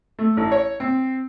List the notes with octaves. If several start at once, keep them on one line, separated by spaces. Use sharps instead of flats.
A3
A1
C#5
C4